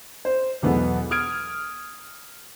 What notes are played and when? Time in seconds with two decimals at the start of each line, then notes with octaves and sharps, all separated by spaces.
0.25 C5
0.62 B1 E2 B3 G#4 A4
1.11 D#6 F6 G#6 D7